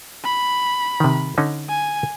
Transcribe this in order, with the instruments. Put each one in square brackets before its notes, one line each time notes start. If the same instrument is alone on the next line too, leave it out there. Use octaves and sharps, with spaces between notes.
[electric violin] B5
[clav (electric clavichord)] C3 D#3
D3 C#4 D#4
[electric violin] G#5